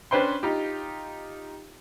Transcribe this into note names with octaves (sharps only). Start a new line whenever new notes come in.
C#4 D4 B4 C5 G5 C6
D#4 F4 G4